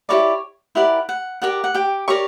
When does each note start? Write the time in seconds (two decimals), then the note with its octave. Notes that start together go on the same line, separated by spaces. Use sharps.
0.09 E4 G4 A#4 C#5 D5 C#6
0.75 E4 G4 A#4 D5 F#5
1.09 F#5
1.42 G4 A#4 D5 F#5
1.64 F#5
1.74 G4 G5
2.08 G4 A#4 C#5 D5 C#6